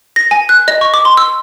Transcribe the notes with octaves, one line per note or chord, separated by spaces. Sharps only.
A#6
G#5
F#6
D#5
C#6
D6
C6
E6